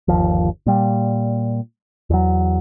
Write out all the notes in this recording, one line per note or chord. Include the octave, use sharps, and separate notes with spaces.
G1 D#2 F3
A#2 G3
E2 F#3